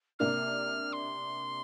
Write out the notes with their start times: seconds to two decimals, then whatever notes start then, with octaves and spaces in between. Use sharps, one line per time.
0.19 C3 A#3 D4 F6
0.93 C6